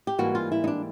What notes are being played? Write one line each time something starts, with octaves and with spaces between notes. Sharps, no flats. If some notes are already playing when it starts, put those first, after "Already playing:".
G4
G#2 E3 G3 A#3 F#4
F4
E4
D#4
D4